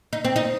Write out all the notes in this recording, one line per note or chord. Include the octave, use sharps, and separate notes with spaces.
D#4
C4
D#4